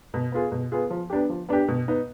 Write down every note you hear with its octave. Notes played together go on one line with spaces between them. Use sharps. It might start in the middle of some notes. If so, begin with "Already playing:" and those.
B2
B3 F4 G#4
B2
B3 F4 G#4
F3
B3 D4 G4
F3
B3 D4 G4
B2
B3 D#4